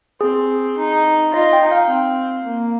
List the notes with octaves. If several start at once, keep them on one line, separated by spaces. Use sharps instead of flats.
C4 G#4
D#4
F4 D#5
G5
D#4
F5
C4
A#3